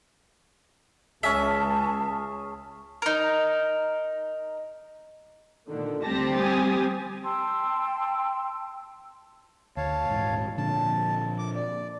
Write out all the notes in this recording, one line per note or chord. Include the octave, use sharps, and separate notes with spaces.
C#2 C#4 G#4 E5 A5
D#4 A#4
A#2 D3 D#3
D2 G3 C4 G4 A5 A#6
G#5 D#6 A6
G5 A5 C6 E6
D2 C#5 F5 A5
D#1 G#2 E3
A#2 D3 F3 A5
D6
D5